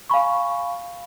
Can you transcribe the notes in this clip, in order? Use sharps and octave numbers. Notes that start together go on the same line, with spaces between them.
F5 G#5 B5 C#6